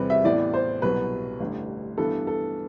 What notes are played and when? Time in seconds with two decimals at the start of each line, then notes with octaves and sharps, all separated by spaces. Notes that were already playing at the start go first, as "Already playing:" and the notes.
Already playing: E2 C3 G3 C4 B4
0.10 E5
0.24 A1 A2 E3 B3 D5
0.54 C5
0.82 C2 B2 F#3 B4
1.40 A1 G2 D3
1.98 G2 E3 B3 A4
2.27 A4